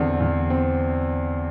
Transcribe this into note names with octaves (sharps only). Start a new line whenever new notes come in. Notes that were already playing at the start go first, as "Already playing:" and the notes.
Already playing: E2 D3 C4
E2
C4